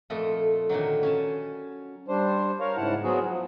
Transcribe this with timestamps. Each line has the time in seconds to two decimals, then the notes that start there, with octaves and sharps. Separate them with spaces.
0.10 F2 A#2 A3 F4 A4 D#5
0.69 A#2 D3 D#3 F#3
1.03 C#4 G#5 A5
2.08 G3 D4 C5
2.60 A#4 C#5 F5
2.77 G#2 C#3 E4 F#5 A5
3.04 F#3 B3 C4 F#4 G#4
3.28 F3